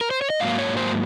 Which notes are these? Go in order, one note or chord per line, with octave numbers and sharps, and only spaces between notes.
A#4
C5
C#5
D#5
G#2 F#3 A#3 F5
C#5
C5